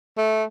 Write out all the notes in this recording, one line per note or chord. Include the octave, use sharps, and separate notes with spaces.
A3